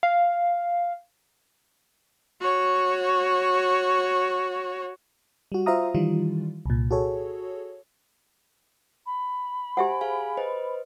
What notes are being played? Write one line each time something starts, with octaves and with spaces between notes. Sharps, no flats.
F5
F#4 C#5
G3 F#4
F4 C5 E5 F5 A#5 D#6
D#3 E3 G3 F4
C2 A#2
F#4 G#4 A4 C#5
B5
G4 C5 E5 F#5 G#5
G#4 F5 G#5
B4 C5 D#5